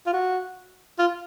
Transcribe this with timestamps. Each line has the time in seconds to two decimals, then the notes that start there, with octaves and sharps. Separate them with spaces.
0.06 F4
0.13 F#4
0.99 F4